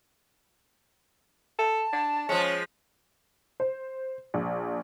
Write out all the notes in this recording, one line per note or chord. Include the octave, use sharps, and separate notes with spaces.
A4 A5
D4
F3 G#3 C#4
C5
A#1